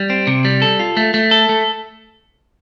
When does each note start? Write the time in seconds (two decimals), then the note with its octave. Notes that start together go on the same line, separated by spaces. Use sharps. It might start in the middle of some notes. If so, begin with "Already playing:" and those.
Already playing: G3
0.10 C4
0.27 C3
0.45 G3
0.62 A4
0.80 F4
0.97 A3
1.14 A3
1.31 A4
1.49 A3